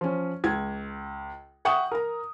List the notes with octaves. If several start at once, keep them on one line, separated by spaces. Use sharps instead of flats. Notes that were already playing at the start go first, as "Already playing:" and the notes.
F3 C#4
C#2 G#6
E5 F#5 G5 C#6 D#6
A#4 A#5